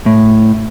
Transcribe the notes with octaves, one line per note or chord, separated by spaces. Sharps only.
A2